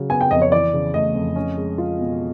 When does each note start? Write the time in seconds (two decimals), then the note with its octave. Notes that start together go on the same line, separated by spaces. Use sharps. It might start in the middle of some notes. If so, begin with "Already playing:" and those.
Already playing: C#3 F#3
0.10 B3 G#5
0.21 G5
0.31 F2 D#5
0.42 C#5
0.52 E3 D5
0.74 C#3
0.94 A3 D#5
1.14 F2
1.36 C#4
1.58 G#3
1.78 F4
1.99 B2